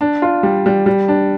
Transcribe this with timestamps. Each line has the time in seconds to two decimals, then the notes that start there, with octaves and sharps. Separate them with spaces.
0.01 D4
0.22 F4
0.43 G3
0.66 G3
0.86 G3
1.08 D4